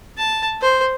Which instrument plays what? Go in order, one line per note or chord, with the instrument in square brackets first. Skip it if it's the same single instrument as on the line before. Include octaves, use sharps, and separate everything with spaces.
[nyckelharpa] A5
C5